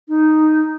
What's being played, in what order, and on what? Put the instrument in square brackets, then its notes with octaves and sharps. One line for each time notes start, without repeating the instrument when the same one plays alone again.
[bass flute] D#4